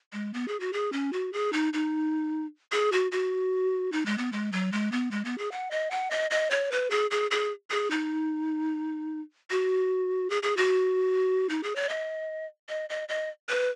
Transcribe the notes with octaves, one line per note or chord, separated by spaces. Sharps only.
G#3
B3
G#4
F#4
G#4
C#4
F#4
G#4
D#4
D#4
G#4
F#4
F#4
D#4
G#3
B3
G#3
F#3
G#3
B3
G#3
B3
G#4
F#5
D#5
F#5
D#5
D#5
C#5
B4
G#4
G#4
G#4
G#4
D#4
F#4
G#4
G#4
F#4
D#4
G#4
C#5
D#5
D#5
D#5
D#5
B4